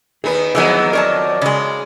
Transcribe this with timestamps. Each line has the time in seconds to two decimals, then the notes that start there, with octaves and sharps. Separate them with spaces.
0.24 D#3 B3 G#4 B4
0.55 F2 D#3 E3 F#3 G#3 B3 D#5
0.93 A#4 C#5 D5 A5
1.41 C#3 G#3 C#4